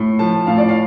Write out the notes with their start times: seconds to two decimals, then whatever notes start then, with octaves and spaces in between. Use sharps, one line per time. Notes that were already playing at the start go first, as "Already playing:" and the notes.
Already playing: A2
0.19 F3 A5
0.47 A2 F5
0.58 D5
0.69 F5